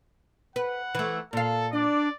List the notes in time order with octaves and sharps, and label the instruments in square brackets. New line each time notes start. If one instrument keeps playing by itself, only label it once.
[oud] B4 [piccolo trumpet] F#5
[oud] E3 A3
[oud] A#2 F5 [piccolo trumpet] A4
[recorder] D4 [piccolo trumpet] D5